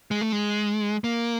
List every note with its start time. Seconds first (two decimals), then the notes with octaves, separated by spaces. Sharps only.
0.11 G#3
0.21 A3
0.32 G#3
1.04 A#3